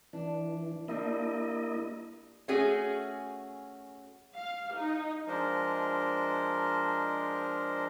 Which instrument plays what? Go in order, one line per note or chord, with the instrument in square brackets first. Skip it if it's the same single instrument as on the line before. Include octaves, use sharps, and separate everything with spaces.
[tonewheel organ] E3 [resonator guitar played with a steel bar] D4
[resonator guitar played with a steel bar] G3 D4 [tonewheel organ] A#3 E4 D#5
[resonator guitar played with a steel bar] A3 C#4 F#4 G#4
[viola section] F5
D#4
[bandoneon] F3 G#3 D4 A#4 C5 D#5